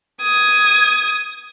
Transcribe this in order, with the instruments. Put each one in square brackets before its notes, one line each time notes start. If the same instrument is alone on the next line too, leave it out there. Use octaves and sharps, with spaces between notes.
[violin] D#6 G#6